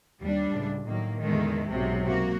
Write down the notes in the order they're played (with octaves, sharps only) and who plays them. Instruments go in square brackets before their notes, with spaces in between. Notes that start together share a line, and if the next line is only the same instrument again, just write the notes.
[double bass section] D#2 [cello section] G3 D4
[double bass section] C#2 A2
[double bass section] A2 D#3 F#3 [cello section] A#3
[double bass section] E2 D3 [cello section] D#3 G#3 A3
[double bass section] B1 G#2 F#3 [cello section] C3
[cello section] A#3 F#4